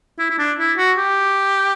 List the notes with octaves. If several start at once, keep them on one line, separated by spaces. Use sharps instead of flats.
E4
E4
D4
E4
F#4
G4